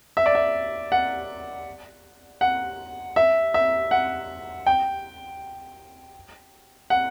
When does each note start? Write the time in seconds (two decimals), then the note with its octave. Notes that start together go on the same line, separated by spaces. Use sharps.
0.17 E5
0.26 D5
0.35 E5
0.92 F#5
2.41 F#5
3.16 E5
3.54 E5
3.91 F#5
4.67 G5
6.90 F#5